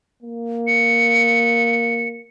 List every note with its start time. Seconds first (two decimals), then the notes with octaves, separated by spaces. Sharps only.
0.23 A#3
0.67 C#7